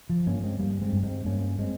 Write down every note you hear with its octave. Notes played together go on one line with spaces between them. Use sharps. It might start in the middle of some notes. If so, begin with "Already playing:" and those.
F3
G2 A#3 C#4
G#3 C4
G2 G3 A#3
G#3 C4
G2
G#3 C4
G2 A#3 C#4
G#3 C4